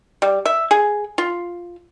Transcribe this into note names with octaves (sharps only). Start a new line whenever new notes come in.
G3
E5
G#4
F4